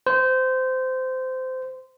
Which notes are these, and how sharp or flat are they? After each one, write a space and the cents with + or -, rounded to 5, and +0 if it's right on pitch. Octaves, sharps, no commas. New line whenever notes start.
C5 -20